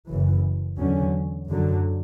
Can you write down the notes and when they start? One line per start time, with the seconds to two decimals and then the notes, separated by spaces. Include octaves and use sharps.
0.10 F#1 F#2 C#3 E3
0.79 E2 D3 F#3 C#4
1.48 F#2 D3 F#3